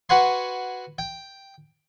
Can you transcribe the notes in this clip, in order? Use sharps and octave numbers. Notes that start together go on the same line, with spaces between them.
F#4 B4 F#5 G#5 C6
G5